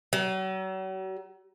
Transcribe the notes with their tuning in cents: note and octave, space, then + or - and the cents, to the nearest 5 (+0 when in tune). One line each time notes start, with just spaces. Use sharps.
F#3 +40